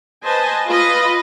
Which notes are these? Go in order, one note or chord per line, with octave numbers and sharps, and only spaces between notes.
B4 C5 D#5 G#5 A5
F4 B4 D#5